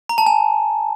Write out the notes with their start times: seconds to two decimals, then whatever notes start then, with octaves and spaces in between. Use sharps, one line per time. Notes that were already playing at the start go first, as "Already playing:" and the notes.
0.09 A#5
0.18 A5
0.26 G#5